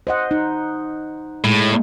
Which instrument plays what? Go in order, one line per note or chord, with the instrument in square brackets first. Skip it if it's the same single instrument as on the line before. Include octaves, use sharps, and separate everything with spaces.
[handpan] C5 D#5 F#5
D#4
[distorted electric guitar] A2 [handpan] G#3